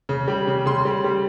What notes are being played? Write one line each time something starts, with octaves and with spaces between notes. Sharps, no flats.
C#3
G3
C#3
C#3 C6
G3
G3